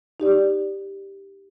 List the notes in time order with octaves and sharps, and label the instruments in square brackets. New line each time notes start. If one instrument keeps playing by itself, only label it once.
[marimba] D#4 G4 D5